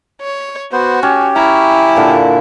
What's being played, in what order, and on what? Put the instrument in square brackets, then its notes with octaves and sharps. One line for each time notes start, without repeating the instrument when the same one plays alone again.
[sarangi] C#5
[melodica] B3 C5 [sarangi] F#4
[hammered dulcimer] C#4 [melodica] G4
[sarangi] E4 [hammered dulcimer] A#5
[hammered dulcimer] A#2 D3